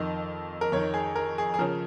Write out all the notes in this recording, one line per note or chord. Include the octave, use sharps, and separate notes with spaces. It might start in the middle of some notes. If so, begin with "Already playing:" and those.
Already playing: F2 D#3 D#5
A#4
F2 D#3 C#5
G#4
A#4
G#4
G#4
C#3 F3 A#4